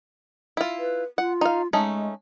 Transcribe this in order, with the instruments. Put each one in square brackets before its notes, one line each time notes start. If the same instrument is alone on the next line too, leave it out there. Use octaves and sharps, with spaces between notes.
[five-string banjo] E4 F4
[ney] B4
[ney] F4 [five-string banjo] F#5
[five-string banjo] D#4 F5
[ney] G#3 [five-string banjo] A3 C#4 D#4